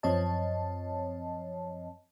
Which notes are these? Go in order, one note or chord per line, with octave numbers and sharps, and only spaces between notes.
F#2 F3 C4 C#5 D#5 A5